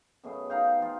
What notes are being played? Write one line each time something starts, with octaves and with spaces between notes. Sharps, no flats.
F#2 B2 A3 G#4
D#4 F5 G5
F3 F4